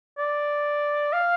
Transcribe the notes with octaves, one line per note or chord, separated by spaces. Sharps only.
D5
F5